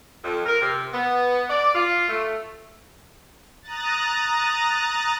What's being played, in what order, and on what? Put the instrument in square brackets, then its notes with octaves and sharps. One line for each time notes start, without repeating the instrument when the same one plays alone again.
[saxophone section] F2
A#4
C3
B3
D5
F4
A3
[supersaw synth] A#5 D#6 F#6 A6